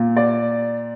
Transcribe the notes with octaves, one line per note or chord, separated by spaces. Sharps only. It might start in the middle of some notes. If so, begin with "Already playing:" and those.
Already playing: A#2
D5